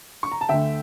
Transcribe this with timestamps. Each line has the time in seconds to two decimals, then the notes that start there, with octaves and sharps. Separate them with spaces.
0.23 C#6
0.32 A#5
0.41 A5
0.49 D2 D3 A3 E5 G5